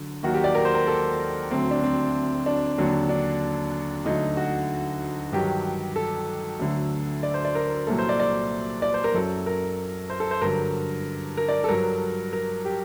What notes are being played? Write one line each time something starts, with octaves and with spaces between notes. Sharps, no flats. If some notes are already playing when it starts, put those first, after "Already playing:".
Already playing: D3 F#3
D#2 D#3 F#3 F#4
G4
D5
A#4
C5
A#4
A4
D2 D3 F#3 C4
D4
C4
D4
D#2 D3 F#3
D4
D2 D3 F#3 D#4
F#4
G2 D#3 F#3 G4
A4
D2 D3 F#3
D5
C5
D5
A#4
C2 A#2 F#3 A4
C5
D5
D5
D5
C5
A#4
F#2 F#3 A4
A#4
C5
A4
C5
G2 D3 F#3 A#4
A#4
D5
A4
G2 F#3 A#4
A#4
G4